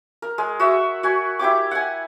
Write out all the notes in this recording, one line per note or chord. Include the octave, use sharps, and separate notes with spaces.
A#4
G#3
F#4 E5
F#4 G#5
E4 G4 G5 D6
F#5 G#5